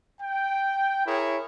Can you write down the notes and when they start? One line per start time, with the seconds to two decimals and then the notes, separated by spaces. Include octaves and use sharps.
0.21 G5
1.07 E4 G#4 A#4 C#5